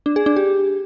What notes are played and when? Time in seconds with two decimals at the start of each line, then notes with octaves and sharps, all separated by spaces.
0.06 D4
0.16 G#4
0.26 D4
0.36 G4